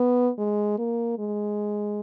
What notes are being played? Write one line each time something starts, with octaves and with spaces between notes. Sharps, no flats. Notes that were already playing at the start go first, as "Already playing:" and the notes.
Already playing: B3
G#3
A#3
G#3